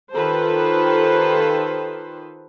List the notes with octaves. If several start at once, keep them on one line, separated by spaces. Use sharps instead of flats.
D#3 F4 G4 A4 B4 C5